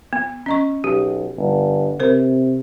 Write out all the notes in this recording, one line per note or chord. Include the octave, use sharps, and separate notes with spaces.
B3
C#4 D#5 C#6
B1 G4
G1
C3 A#4 C5